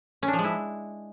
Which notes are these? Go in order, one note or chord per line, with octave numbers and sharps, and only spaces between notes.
C#4
D4
F3
G#3
E4